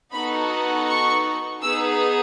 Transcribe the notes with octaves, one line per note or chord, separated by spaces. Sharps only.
B3 D#4 F#4 A4 B5
C#6
B3 D#4 G#4 E6